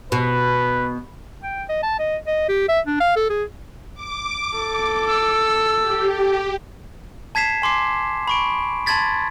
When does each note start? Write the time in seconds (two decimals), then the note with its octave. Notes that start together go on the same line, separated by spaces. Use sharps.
0.12 B2 B4
1.43 G5
1.69 D#5
1.83 A5
1.99 D#5
2.27 D#5
2.49 G4
2.69 E5
2.87 D4
3.00 F5
3.16 A4
3.30 G#4
3.95 D6
4.56 A4
5.07 E6
5.81 G4
7.35 A5 G#6 B6 C7 E7
7.62 G#5 C6 D6 C7
8.28 B5 C#6 D7
8.86 A5 B5 C6 G#6 A6 B6